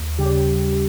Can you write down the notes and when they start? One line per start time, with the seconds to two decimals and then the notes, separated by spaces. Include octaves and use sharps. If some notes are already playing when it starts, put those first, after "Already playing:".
Already playing: D#2
0.19 C#3 G3 G4